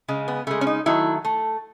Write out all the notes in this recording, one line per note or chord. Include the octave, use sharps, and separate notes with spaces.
C#3 G#3
B3
C#3 G#3 A3
C#4
D#4
D#3 F#3 A3 E4
A3